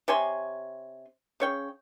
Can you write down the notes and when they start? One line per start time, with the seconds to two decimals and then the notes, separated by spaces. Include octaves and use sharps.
0.08 C3 C#5 G#5 C6
1.40 C#3 C#5 G5